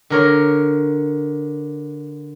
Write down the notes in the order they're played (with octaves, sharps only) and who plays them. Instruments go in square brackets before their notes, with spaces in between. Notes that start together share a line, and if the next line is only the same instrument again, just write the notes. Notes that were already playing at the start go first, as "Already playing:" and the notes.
[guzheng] D3 A#4 C#5